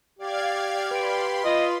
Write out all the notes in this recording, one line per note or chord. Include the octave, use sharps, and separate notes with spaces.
G4 D5 F5 G#6
B4 B5 C6 D7
F4 D#5